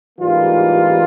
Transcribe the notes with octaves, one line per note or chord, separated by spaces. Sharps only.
A1 G#2 E3 G3 A#3 F4